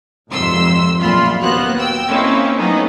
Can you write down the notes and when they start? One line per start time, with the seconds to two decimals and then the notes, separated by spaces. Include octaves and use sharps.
0.30 G#1 F2 C3 C6 E6
1.00 A#1 F#2 A#2 F4 B5 C6
1.41 D#2 A#3 B3 F#4 C5 F#6
1.77 G5 E6
2.09 A#3 C4 C#4 D#4 E4
2.57 F#3 A3 B3 C#4 D#4